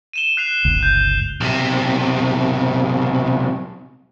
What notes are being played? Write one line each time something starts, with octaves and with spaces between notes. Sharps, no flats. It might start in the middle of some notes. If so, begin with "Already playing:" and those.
D#7 E7 G7
F#6 C7 F7
G1 C#2
G6
B1 C3